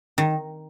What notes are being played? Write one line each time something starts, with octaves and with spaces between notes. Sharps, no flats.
D#3